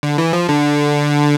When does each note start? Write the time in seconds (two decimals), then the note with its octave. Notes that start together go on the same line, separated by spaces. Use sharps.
0.03 D3
0.18 E3
0.33 F3
0.49 D3